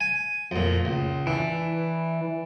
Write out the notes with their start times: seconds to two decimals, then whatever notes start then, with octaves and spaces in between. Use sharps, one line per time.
0.01 G#5
0.51 F2 A#2
0.85 C#2
1.27 E3 D4